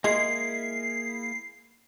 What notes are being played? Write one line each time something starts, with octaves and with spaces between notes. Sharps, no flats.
G#3 A#3 E4 G#4 C7